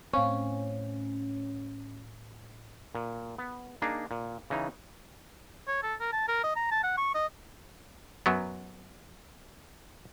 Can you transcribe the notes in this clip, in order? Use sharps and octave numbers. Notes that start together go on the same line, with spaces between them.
A2 C4 C#4 F5 C#6
A#2
B3
A#3 D4 D#4 G#4
A#2
C#3 E3 D#4
C#5
A4
A#4
A5
A#4
D#5
A#5
A5
F#5
C#6
D#5
F#2 F#3 B3